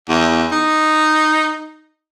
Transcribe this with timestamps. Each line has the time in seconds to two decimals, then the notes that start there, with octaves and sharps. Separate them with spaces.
0.09 E2
0.52 D#4